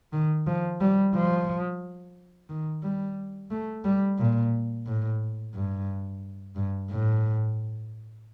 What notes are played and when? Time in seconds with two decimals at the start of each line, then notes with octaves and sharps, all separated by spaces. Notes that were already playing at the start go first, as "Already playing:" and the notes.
0.13 D#3
0.47 F3
0.81 G3
1.15 F3
2.49 D#3
2.83 G3
3.51 A3
3.85 G3
4.19 A#2
4.86 A2
5.55 G2
6.56 G2
6.90 A2